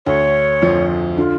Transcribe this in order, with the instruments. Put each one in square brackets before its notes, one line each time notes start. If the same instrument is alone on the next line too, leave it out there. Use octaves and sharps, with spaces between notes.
[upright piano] D2 D3 [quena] C#5
[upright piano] F2 F3
[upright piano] D3 [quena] F4